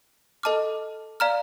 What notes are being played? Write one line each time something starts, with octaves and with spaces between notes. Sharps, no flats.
A4 D#5 A5 D6 F6
D5 F5 A#5 F6